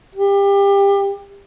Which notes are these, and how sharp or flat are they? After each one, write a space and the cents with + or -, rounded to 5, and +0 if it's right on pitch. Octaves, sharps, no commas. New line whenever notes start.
G4 +25